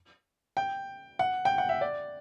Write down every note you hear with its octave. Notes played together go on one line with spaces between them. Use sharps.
G5
F#5
G5
F#5
E5
D5